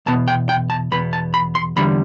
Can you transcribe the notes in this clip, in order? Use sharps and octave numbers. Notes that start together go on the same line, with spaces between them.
E2 B2 B3 A5
G5
G5
A5
E2 B2 B3 B5
A5
B5
C6
E2 D3 G3 B5